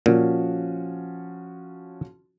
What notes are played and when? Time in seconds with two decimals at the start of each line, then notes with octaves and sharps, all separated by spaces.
0.06 A#2 F3 C#4 F#4